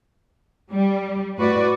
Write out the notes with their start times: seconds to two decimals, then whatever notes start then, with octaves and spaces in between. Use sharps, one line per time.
0.72 G3
1.38 A2 F#4 B4 D5